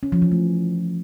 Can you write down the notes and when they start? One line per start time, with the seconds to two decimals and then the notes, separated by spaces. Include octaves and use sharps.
0.03 C#4
0.12 F3
0.22 E3
0.32 A3